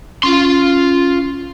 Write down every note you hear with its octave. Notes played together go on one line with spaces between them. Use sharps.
C#4 F4 C6